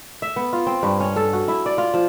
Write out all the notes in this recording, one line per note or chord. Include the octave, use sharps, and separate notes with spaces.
E5
B3
F4
C4
G2
C#4
A4
F#4
E4
D5
F4
F3